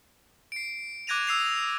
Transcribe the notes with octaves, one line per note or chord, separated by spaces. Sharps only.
C7 D7
D6 F#6 G#6 A#6 D#7 F7
D#6 E6 C7 F7